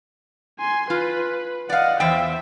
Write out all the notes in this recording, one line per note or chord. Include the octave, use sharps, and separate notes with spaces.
G#5 C6
F4 B4
D5 D#5 F5 F#5
E2 C5 E5 F5 G5